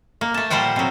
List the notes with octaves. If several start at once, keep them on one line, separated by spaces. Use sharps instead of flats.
A#3
A3 A5
A#2 F3 G3 C5 F#5 G5
C3 F#3